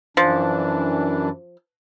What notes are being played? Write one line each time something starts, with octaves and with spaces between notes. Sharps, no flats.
F#2 E3 F3 D4